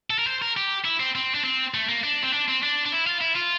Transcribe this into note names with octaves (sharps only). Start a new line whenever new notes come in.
A4
A#4
C5
A#4
G4
E4
C4
C4
D4
C4
A3
A#3
D4
C4
D4
C4
D4
D4
E4
F4
E4
F4